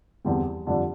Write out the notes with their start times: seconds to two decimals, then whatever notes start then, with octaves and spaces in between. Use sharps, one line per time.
0.25 E2 D3 G3 C4
0.67 F2 D3 G3 D4